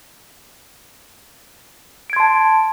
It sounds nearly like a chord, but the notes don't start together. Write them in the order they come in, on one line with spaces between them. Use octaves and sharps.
D7 G#6 C6 A5